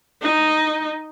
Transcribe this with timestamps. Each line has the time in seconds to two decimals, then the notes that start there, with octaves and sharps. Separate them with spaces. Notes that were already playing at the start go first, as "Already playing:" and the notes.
0.22 D#4